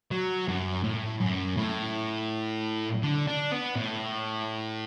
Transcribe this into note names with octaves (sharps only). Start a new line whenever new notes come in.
F#3
F#2
A2
F#2
A2
D3
D4
B3
A2